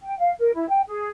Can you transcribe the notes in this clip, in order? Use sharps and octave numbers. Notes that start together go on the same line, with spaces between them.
G5
F5
A#4
E4
G5
G#4